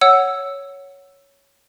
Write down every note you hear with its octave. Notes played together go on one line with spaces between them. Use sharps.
C#5 F#5 E6